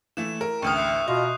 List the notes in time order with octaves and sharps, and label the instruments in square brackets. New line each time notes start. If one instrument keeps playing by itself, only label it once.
[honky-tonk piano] E3 A3 [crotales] E7
[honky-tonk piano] A#4
[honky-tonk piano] A1 D2 F6 [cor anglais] G5 [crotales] C#6 D#6
[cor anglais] E5 [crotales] F#6 G6 C7
[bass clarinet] B2 [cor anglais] F4 [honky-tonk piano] D#5